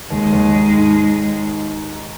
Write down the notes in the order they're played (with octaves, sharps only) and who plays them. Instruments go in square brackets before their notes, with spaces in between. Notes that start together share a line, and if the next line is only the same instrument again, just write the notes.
[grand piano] D#2 [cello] G#3
[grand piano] D#2
D#4
G#2